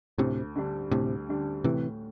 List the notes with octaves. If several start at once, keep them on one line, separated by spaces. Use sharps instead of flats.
D2 A2 C3
D3 G3 D4
D2 A2 C3
D3 G3 D4
A2 C3 E3